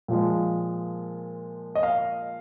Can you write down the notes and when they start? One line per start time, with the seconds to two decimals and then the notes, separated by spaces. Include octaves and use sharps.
0.08 A#2 F3 G#3
1.75 D#5
1.83 F5